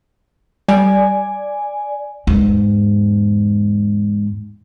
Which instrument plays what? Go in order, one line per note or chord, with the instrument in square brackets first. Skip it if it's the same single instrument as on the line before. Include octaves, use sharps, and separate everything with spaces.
[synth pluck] G3 [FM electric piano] D5 G#5
[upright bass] E2 G#2